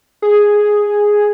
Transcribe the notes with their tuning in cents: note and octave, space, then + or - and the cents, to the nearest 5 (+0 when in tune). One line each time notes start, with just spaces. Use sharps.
G#4 +0